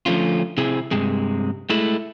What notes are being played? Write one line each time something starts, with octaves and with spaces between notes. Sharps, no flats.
D3 F3 A3 C#4 F4
C3 C4 E4 G#4
G2 C3 G#3
G#3 A3 E4